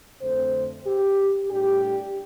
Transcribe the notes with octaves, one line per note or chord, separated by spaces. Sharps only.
F2 D3 A3 C4 C5
G4
A2 G3 D4 G4